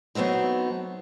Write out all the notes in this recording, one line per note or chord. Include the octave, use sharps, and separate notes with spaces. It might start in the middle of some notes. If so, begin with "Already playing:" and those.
F#3 A3 B3 C4 D#4